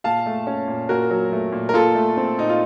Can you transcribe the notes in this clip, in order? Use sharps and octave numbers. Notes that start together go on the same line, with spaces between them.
A#2 F5 A5
A3
C#4
A#2
A#2 F#4 A#4
F#3
A3
A#2
A#4
A#2 F4 A4
A3
C4
A#2 D#4
F4